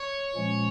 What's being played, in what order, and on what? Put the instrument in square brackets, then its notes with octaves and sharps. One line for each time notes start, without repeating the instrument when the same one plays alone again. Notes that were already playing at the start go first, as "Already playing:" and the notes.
Already playing: [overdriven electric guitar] C#5
[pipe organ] A#2 F3 G#3 C#4